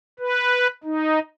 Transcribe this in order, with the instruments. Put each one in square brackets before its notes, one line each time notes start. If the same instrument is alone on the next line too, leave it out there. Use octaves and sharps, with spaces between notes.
[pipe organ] B4
D#4